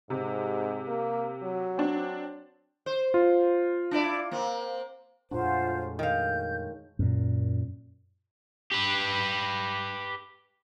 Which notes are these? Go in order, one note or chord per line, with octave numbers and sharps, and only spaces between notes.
G#2 C3
A#3
F#3
C4 D4
C5
F4
D4 E4 D5
A#3 C4
F2 A#2 F#3 G#3 A3 D4 F4 C5
D#3 F5 G6
F#2 A#2
G4 B4